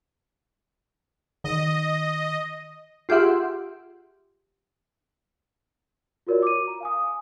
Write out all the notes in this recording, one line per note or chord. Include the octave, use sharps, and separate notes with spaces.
D#3 D#5
F4 G4 G#4 E5 F#5 C6
F4 F#4 A#4 C#5 D5
D6 D#7
A#5
F5 G#5 D#6
G#5